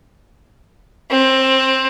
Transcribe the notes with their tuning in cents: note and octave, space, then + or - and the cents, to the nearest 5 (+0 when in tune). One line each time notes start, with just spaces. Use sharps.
C4 +15